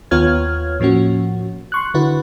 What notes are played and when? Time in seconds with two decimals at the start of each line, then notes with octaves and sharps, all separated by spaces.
0.11 D#2 B3 F4 C#5 F6 G#6
0.80 A2 F3 A#3 C#4 F#4
1.72 C6 C#6 F#6
1.94 D3 E4 F#4 B4